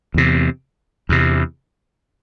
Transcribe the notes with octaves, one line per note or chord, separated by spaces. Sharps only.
E2 C3
E2 C3